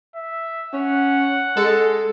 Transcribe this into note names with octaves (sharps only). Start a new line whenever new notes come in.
E5
C#4 F#5
G#3 A4